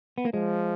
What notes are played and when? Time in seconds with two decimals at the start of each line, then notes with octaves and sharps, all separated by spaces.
0.18 B3
0.25 A#3
0.34 F3 G#3